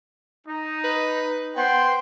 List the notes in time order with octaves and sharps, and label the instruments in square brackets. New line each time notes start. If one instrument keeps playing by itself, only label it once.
[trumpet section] D#4
[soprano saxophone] B4
[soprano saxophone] B3 [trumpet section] C5 G5 C6